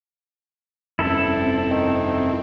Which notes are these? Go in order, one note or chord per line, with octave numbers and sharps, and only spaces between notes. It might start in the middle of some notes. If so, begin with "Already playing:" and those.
F1 G2 C4 C#4 E4 A4
D#3